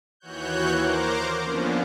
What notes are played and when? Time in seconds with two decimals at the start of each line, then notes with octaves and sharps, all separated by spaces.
0.20 D#2 E3 F#4 C#5 F#6 G6
0.75 A#4 C5 A#5 D6
1.41 D3 F3 A#3 B3 C#4 D4